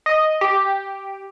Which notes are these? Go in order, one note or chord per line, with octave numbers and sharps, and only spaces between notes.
D#5
G4